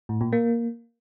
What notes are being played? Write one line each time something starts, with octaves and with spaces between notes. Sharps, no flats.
A2
A#2
A#3